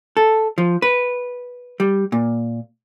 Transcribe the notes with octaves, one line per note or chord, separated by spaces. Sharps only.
A4
F3
B4
G3
A#2